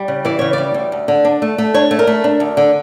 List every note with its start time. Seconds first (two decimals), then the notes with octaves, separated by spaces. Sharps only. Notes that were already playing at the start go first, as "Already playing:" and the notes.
Already playing: G3
0.08 C#3
0.25 E3 D5
0.39 C#3 C#5
0.53 G3 D5
0.74 D2
0.92 D2
1.08 D3
1.25 D4
1.42 A3
1.58 A3
1.74 D4 C#5
1.91 A3
1.99 A#4
2.07 A3
2.24 D4
2.40 D2
2.57 D3